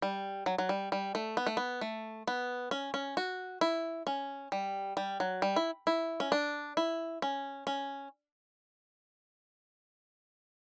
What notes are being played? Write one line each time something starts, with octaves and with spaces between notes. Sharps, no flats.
G3
F#3
F#3
G3
G3
A3
B3
A3
B3
A3
B3
C#4
C#4
F#4
E4
C#4
G3
G3
F#3
G3
E4
E4
C#4
D4
E4
C#4
C#4